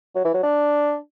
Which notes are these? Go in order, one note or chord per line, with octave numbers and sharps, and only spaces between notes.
F#3
E3
F#3
D4